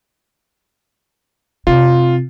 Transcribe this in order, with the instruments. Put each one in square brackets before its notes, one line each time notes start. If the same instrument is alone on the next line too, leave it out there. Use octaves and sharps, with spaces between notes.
[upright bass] C3 C4 [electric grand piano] F4